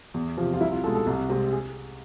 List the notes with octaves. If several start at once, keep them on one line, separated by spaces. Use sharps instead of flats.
E2
C3 F3
F4
C2 E4
F4
B2 G#3 A4
A4
C2
C3 G#3
G#4